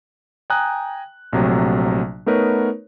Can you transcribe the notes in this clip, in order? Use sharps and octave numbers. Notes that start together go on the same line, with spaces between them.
G5 G#5 A#5 D#6 F#6
A#1 C3 F#3 A3
A3 B3 D#4 A#4 B4 C#5